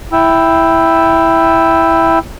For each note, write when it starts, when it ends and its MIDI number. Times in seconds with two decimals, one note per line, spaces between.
0.13 2.19 64
0.13 2.19 79
0.13 2.19 88